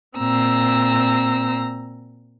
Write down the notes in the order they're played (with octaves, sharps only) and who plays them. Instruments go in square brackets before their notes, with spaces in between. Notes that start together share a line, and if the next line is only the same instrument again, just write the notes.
[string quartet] A#2 C4 A#5 E6